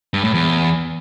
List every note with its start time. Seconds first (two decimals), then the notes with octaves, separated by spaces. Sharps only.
0.14 G2
0.24 A2
0.34 E2